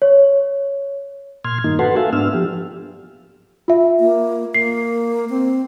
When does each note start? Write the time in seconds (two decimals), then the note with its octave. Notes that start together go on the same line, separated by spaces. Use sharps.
0.02 C#5
1.45 A#2 C6 F6 G#6
1.64 G2 D#3 A#3 D#4
1.79 F#4 A4 B4 F#5 A5 C6
1.97 A#3 A4 E5 F5 G#5 A5
2.13 G#2 B3 D4 E6 F6
2.34 F3 G4
3.68 F4 E5
4.00 A#3
4.54 A#3 C7
5.30 C4